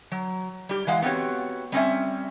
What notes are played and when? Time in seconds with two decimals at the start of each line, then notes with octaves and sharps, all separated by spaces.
0.12 F#3
0.69 G3 G4
0.87 E3 G#3 F5 F#5
1.02 B3 C4 F#4 G4 C#5
1.72 G3 C4 C#4 E5